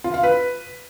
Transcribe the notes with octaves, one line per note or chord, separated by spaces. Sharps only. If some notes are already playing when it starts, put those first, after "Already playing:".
F4
F5
B4